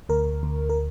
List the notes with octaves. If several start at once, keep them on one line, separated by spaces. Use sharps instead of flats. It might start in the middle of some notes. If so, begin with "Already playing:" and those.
D2 A#4
D2
A#4